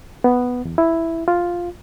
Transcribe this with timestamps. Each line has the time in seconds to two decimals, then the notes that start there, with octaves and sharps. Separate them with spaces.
0.24 B3
0.65 E2
0.78 E4
1.28 F4